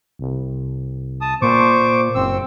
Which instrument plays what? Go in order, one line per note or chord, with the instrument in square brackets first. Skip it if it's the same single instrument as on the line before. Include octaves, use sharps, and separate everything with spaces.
[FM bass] C2
[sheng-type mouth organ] A5 D#6
[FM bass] A#2 [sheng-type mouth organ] C5 C#6 D6
[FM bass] F#1 [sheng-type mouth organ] C4 E6